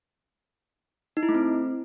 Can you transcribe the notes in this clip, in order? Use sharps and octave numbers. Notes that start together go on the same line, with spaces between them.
D#4
E4
A3
C4